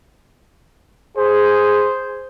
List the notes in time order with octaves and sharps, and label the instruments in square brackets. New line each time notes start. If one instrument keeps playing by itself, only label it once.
[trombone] G#4 [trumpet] C5